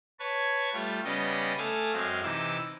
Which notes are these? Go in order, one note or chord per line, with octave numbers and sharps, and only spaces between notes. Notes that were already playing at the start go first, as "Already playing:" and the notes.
B4 C#5 A5 G#6
G3 A3 F4 G4
C#3 G3 B3 D5 D#5 G5
A3 A4 F5 G#5 D6 D#6
F#2 G#3 C4 F5
C3 E3 D#4 D6 E6